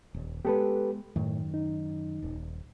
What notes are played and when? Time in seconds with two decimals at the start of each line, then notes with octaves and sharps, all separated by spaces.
0.14 D#1
0.45 G#3 A3 B3 G4 A4 B4
1.16 F#2 A2 D#3
1.54 D#4
2.23 D#1